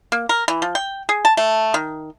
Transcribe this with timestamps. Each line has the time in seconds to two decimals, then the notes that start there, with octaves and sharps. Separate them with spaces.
0.12 A#3
0.29 A#4
0.48 E3
0.62 F3
0.75 G5
1.09 G#4
1.25 A5
1.37 A3
1.74 D#3